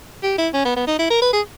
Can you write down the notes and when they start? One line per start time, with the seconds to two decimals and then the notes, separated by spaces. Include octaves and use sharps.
0.23 G4
0.38 E4
0.54 C#4
0.65 B3
0.76 B3
0.87 D#4
0.99 E4
1.10 A#4
1.22 B4
1.33 G#4